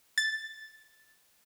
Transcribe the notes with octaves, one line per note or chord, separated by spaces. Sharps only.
A6